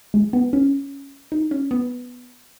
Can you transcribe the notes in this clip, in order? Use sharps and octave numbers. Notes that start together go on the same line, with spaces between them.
G#3
B3
C#4
D#4
C#4
B3